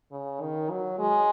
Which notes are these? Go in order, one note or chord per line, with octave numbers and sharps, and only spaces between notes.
C#3
D#3
F#3
G#3